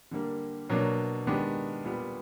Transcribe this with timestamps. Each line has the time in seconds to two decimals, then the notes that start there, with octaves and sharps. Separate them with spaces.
0.11 D3 G3 A#3
0.69 B2 F#3 A#3 D4
1.26 D#3 G#3 B3 D4 G4
1.85 A#2 G3 B3